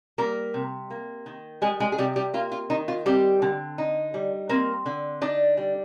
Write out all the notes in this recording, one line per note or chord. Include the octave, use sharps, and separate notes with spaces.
G3 A#3 A#4
C3
A#3
D#3
G3 G#3 G#4
G#3 G#4
G#4
C3 G3 G4
G3 G4
A#3 F4
F4
D#3 D#4
F4
G3 C4 G4
D3
D#4
G3
A#3 C4 A#4
D3
D4 D#4 D5
G3